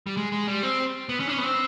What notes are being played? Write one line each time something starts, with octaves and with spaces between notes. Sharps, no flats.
G3
G#3
G#3
G3
C4
B3
C#4
D4
C#4
B3
C4